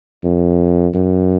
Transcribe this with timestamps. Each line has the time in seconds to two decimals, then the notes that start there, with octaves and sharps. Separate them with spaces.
0.24 F2
0.94 F#2